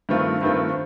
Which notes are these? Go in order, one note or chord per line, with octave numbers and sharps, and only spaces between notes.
G2 D#3 A3 C4 F4
G2 D#3 A3 C4 F4